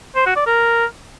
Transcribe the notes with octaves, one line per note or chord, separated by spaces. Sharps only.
C5
F#4
D5
A#4